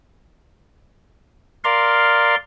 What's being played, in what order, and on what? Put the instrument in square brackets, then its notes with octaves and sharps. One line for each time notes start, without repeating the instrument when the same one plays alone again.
[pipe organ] A#4 D5 F5 C6